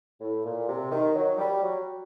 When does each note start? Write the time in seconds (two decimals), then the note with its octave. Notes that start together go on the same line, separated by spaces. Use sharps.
0.21 A2
0.45 A#2
0.69 C3
0.91 D#3
1.15 F#3
1.38 G3
1.63 F#3